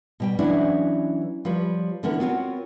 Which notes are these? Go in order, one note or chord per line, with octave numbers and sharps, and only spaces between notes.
B2 G3 G5
E3 F#3 C#4 D4 E4
F3 G3 B4 C#5
D3 E3 B3 C#4 A#4
B3 C4 F4 F#4 A#4 C#5